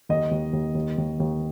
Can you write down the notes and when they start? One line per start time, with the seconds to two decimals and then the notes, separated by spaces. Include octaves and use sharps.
0.09 D#2 D#5
0.31 D#2
0.53 D#2
0.75 D#2
0.98 D#2
1.20 D#2